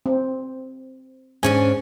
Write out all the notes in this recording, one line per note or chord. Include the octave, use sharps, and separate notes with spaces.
C4
G#2 C#4 D4 G#5